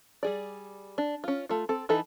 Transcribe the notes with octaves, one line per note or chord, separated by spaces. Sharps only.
G3 G#4 D5
D4
C#4 F4
A3 F4
C4 A4
E3 D#4 A4 B5